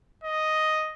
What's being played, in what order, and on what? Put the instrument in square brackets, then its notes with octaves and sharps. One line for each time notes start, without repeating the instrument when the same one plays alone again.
[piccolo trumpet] D#5